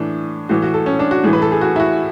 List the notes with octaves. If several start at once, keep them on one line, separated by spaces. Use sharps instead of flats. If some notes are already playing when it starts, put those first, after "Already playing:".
Already playing: A2 E3 D4
A2 E3 F#4
F#4
A4
C#4
D4
F#4
A2 E3 G#4
B4
A4
G#4
F#4
E4
F#4